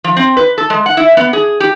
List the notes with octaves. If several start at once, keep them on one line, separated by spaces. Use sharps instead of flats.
F3
C4
B4
A4
G#3
F#5
E4
B3
G#4
G4